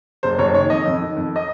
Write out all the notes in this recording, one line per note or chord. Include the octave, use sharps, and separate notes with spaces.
F#1 C5
F#1 C#5
D#3 C#5
F2 D#5
F2
D#3
F2
D#5